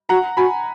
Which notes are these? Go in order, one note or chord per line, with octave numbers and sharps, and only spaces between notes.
F#4 F#5 A#5
F#4 G#5 B5